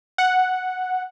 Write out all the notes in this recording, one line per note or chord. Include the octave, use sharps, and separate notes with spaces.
F#5